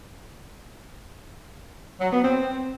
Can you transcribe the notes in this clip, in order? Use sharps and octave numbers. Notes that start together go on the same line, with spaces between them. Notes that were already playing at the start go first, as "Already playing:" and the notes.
F#3
B3
C4